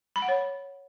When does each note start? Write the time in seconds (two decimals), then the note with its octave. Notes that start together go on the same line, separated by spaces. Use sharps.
0.16 B5
0.22 F#5
0.28 C#5